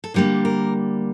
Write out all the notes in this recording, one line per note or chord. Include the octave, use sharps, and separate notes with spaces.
A4
D3 G3 A#3 A#4
A#4